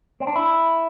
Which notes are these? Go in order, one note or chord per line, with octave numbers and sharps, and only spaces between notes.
C4
D4
E4